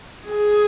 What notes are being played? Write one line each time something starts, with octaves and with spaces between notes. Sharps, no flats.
G#4